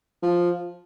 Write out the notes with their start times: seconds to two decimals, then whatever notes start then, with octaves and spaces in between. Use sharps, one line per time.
0.23 F3